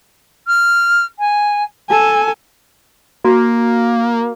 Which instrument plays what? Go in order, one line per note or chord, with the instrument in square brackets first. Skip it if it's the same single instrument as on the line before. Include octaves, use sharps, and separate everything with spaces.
[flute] F6
G#5
[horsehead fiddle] A4 G#5 [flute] A5
[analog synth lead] A#3 [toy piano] F#4